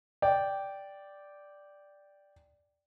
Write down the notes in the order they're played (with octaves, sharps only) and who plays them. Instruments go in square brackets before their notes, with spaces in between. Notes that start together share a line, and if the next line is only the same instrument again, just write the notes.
[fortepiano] D5 G5